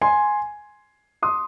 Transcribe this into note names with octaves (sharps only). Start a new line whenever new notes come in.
G#5 C6
C6 D#6